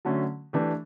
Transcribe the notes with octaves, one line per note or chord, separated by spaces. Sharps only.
D3 F#3 A3 C#4
E3 A3 D4 G4